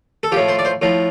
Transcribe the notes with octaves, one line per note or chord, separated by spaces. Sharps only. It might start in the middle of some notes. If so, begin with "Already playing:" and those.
A4
A2 F3 G4
C5
D5
C5
A2 F3